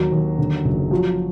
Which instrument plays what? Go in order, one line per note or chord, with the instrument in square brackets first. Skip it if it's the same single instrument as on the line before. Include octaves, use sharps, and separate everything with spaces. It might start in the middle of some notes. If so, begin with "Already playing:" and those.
Already playing: [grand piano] D#2 [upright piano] F#3
[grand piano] D#2
D3
F#1
[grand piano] F3 [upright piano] F#3